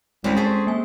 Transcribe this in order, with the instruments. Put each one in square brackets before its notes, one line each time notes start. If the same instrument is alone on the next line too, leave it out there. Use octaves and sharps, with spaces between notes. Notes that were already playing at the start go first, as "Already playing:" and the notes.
[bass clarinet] C2 [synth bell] G#3 C6 B6 [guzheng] C4 C#4
[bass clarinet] G#4 [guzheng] A4 C5
[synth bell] A#3 G#5